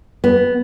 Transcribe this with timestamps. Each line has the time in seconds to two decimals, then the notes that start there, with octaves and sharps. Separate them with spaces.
0.24 B3